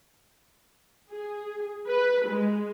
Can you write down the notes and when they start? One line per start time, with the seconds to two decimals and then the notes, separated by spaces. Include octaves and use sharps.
1.10 G#4
1.88 B4
2.27 G#3